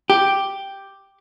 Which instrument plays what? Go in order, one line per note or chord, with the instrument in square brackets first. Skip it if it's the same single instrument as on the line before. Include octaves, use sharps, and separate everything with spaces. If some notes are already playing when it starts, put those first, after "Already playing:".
[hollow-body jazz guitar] G4